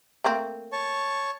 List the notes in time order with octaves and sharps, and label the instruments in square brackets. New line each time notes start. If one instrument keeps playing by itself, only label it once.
[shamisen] A3 A#3 C4
[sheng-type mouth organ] C#5 A5 C#6